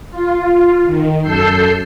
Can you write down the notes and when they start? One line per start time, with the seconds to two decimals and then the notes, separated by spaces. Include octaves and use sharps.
0.11 F4
0.86 D#3
1.22 F#2 A4 E6 G6 C7